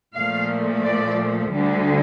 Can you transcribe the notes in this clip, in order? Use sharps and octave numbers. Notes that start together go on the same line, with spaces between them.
A#2 F3 A3 F5
D5
D2 D3 G3